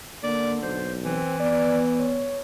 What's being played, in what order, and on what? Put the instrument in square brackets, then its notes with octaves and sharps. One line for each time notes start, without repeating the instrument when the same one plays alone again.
[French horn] D3 [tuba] A#3 [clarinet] D5
[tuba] B1 [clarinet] C5
[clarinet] E3 [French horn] C4
[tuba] B3 [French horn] D5
[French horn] C#5